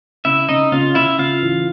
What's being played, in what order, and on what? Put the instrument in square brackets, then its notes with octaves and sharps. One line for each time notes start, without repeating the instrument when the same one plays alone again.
[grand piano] C#3 [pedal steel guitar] E4 E5
[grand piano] C#3 [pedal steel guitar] D#4 D#5
[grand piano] C#3 [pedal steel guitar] F4 F5
[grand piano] C#3 [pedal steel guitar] E4 E5
[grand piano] C#3 [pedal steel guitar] F4 F5
[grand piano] E3